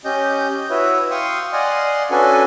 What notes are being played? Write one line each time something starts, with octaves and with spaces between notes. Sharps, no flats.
C#4 G4 D#5 G6
E4 F#4 B4 C#5 E5
F5 G5 C6 C#6 D#6
D5 D#5 F5 F#5 G#5 C6
C#4 D4 F#4 A4 B4 G#5